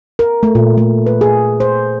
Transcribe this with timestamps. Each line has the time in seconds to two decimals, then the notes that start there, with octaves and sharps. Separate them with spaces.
0.19 A#4
0.43 A3
0.55 A#2
0.78 A3
1.06 B4
1.21 G#4
1.60 C5